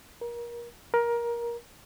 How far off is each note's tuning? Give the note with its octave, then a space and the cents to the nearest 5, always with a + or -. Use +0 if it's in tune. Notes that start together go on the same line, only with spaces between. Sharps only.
A#4 +30
A#4 +20